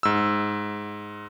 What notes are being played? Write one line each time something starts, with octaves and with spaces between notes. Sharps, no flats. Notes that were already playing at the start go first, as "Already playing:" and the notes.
G#2 E6